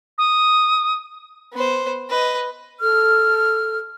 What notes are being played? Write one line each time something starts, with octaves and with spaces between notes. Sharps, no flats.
D#6
B3 C5
B4 D#5
A4 F6